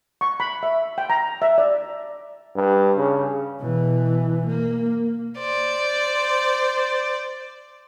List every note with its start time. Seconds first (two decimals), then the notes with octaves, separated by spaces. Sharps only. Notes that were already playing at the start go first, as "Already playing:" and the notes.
0.21 C#6
0.40 B5
0.63 E5
0.98 G5
1.10 A#5
1.42 E5
1.58 D5
2.56 G2
2.98 C#3
3.59 B2 E3
4.47 A#3
5.37 C5 D5